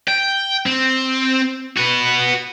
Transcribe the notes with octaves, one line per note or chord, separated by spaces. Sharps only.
G5
C4
F#4 B4